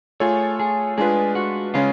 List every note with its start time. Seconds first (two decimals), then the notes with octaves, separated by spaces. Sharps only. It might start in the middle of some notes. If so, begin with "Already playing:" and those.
0.20 A3 F4 G#4 A4 C#5
0.60 G#4
0.98 G#3 D4 F4 G#4 B4
1.35 F#4
1.74 C#3 G#3 C#4 F4